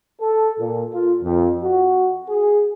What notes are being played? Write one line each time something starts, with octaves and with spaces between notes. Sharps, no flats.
A4
A#2
F4
F2
F#4
G#4